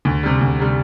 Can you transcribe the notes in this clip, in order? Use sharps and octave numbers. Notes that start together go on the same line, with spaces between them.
D2
C3 G3
D2
C3 G3